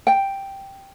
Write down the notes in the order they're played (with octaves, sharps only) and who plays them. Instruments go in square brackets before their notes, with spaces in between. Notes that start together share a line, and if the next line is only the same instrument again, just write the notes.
[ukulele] G5